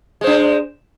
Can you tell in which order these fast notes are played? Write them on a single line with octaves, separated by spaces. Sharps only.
G#3 C5 D4